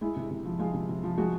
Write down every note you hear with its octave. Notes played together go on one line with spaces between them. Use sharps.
G#3 E4
C3
C3
F3
G#3 F4
C3
C3
F3
G#3 F#4